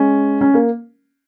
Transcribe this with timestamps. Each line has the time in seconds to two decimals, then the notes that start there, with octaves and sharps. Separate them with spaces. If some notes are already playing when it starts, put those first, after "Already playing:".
Already playing: G#3 C#4
0.41 C#4
0.54 A#3